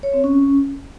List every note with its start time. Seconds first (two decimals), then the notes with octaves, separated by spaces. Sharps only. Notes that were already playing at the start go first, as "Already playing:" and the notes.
0.03 C#5
0.14 C4
0.24 C#4